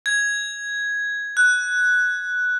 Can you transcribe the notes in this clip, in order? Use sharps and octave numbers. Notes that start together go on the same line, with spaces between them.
G#6
F#6